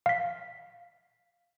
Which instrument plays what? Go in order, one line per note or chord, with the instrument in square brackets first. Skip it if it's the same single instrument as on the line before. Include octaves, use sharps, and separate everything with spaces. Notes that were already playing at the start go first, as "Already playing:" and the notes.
[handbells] F5 B6